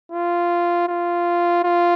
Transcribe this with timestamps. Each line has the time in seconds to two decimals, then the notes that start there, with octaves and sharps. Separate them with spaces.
0.12 F4
0.88 F4
1.63 F4